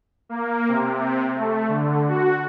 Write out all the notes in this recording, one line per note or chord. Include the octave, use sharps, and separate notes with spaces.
A#3
C3
A3
D3
F#4